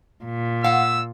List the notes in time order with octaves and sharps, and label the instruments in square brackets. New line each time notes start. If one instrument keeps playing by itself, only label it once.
[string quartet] A#2
[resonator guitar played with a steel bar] F5 F#5 [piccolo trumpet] E6